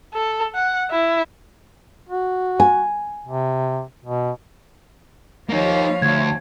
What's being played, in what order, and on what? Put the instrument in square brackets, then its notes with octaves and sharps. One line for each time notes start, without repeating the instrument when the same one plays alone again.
[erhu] A4
F#5
E4
[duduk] F#4
[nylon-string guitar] G#5
[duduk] C3
B2
[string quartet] F3 C#5 F5 [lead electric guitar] A#3 D#4
[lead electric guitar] D2 [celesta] G#6